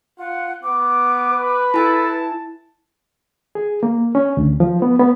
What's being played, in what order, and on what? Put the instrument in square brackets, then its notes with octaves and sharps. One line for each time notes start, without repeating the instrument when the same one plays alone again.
[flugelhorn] F4 [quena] F#5
[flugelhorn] B3 [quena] D6
[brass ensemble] B4
[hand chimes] E4 G#5 [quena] A4 [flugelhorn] A5
[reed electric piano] G#4
A#3
C#4
D2
F3
B3
B3